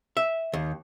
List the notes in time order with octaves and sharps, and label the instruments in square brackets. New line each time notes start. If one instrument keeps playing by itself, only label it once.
[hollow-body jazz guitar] E5
D#2